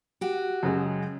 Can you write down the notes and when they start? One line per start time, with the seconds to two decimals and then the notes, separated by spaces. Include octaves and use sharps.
0.21 F#4 G4
0.63 F#2 C#3 G#3